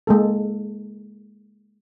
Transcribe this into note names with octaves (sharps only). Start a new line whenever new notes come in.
G#3 A#3 A4